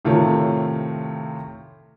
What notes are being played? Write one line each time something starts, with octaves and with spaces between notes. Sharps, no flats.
A2 C3 D#3 F4 A4 C#5